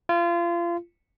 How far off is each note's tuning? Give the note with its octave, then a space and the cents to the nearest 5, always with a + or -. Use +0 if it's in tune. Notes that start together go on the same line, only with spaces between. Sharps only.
F4 -30